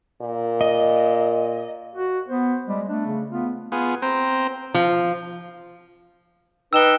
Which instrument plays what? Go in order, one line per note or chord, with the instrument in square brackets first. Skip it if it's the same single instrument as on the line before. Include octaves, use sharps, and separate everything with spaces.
[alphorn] A#2
[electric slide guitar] D#5
[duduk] F#4
[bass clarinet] B3 [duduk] C5
[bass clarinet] G3 [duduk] G#3
[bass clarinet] A3 [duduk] D4
[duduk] C#3
[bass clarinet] B3 [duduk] F4
[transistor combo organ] B3 F4 G#4
C4 C5 G5 A#5
[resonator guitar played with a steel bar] F3
[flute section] D#4 B4 G5 [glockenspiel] E6 E7 G7